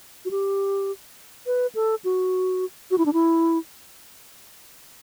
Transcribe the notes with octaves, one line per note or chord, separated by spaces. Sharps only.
F#4
G4
B4
A4
F#4
F#4
E4
D4
E4